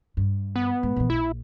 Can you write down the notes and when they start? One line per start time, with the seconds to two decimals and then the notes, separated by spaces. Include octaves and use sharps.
0.17 G2
0.56 B3
0.83 G#2
0.96 A#2 E3
1.10 A#1 E4